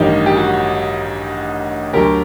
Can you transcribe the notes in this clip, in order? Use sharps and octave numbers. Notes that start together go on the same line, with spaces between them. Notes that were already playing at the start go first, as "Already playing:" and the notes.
Already playing: A1 G2 D#3 D#4 G4
G4
F#4
D2 D3 F#3 G4 A#4